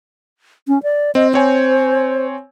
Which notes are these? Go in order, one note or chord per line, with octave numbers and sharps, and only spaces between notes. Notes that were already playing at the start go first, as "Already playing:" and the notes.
C#4
D5
C4 D#5
C4 C5 C#5 G#5